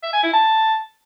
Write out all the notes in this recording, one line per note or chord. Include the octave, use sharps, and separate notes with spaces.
E5
G#5
E4
A5